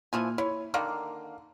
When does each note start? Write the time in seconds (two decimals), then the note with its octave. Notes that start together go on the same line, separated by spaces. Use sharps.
0.13 A#2 E3 F3 G#5
0.38 E4 C#5
0.74 D3 D#3 A#3 F5